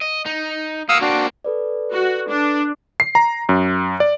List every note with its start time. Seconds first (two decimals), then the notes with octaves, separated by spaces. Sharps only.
0.01 D#5
0.26 D#4
0.89 A#3 F#4 F5 D#6 E6
1.01 A#3 C4 D4 F#4
1.45 A4 B4 D5
1.93 F#4
2.30 D4
3.00 C7
3.15 A#5
3.49 F#2
4.00 D5